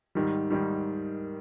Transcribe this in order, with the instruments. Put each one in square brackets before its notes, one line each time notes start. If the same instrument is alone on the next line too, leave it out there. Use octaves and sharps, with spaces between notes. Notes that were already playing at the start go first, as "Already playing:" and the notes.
[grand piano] G#2 D#3 G3
G#2 D#3 G3